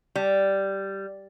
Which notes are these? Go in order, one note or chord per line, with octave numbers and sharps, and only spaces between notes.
G3